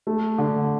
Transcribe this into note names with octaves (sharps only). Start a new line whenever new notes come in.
A3
D3